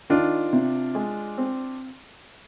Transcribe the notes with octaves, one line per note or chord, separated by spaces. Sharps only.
D#3 D4 F4
C3
G#3
C4